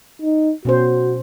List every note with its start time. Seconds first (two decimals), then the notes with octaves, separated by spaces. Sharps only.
0.22 D#4
0.65 B2 C#4 F#4 C5